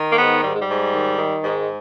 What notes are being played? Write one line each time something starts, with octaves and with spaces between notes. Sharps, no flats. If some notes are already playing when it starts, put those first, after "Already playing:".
Already playing: D#3
A#3
G#2 B3
G#2 G3
G#3
G3
G#2
D#3
D#3
G#2 G#3